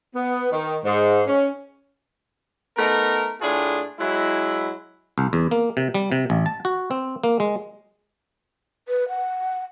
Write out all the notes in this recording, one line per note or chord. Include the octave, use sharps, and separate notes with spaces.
B3
D#3
G#2
C#4
A3 B3 D#4 A#4
A2 A3 D4 F4 G#4
F#3 G#3 E4
C2
E2
A#3
C3
G3
C3
A1
A5
F#4
C4
A#3
G#3
B4
F#5